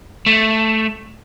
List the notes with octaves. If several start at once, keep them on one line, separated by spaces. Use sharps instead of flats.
A3